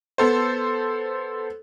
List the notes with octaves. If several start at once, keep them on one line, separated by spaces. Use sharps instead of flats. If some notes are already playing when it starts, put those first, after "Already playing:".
B3 A4 C5